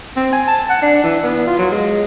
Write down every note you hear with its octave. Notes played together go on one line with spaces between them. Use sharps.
C4
G#5
A5
F#5
D4
E3
B3
F4
F#3
G#3